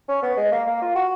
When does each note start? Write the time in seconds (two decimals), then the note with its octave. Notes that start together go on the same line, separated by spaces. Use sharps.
0.08 C#4
0.22 B3
0.37 G#3
0.51 A#3
0.67 A#3
0.82 F4
0.95 F#4